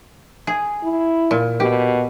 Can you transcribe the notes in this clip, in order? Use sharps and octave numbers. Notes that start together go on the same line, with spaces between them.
G#4
E4
A#2
B2 G4